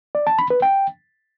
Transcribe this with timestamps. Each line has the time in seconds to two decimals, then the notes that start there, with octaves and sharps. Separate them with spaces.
0.15 D5
0.27 A5
0.39 B5
0.50 B4
0.62 G5